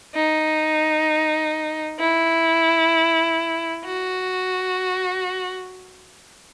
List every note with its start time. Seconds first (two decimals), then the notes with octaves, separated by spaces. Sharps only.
0.15 D#4
2.00 E4
3.85 F#4